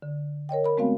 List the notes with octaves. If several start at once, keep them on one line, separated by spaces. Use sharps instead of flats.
D3
A#4 C#5 D#5 G5
A#4 B5
G#3 A3 B3 C4 F#4 F5